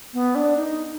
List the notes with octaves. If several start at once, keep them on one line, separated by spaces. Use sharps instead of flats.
B3
D4
D#4